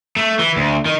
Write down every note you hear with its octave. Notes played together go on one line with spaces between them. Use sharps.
A3
E3
D2
D#3